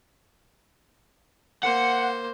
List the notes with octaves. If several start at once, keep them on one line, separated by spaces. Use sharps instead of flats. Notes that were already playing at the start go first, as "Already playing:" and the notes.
A#3 C5 F#5